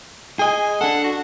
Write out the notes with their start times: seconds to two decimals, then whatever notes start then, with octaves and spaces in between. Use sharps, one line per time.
0.39 G#4 D#5 G#5
0.81 D4 A4 F#5
1.04 F#4